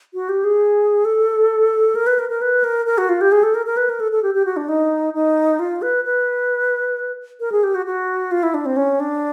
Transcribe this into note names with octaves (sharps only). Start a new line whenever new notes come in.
F#4
G4
G#4
A4
A#4
B4
A#4
A#4
B4
A#4
A#4
F#4
F4
G4
G#4
A4
A#4
A#4
B4
A#4
A4
A4
G4
G4
F#4
D4
D#4
D#4
F4
B4
B4
A#4
G#4
G4
F#4
F#4
F4
E4
D4
C4
C#4
D4